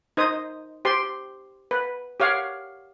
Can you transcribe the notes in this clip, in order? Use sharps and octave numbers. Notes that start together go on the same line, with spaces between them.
D#4 C5 D#6
G4 C5 C6
B4
G4 C#5 F5 F#5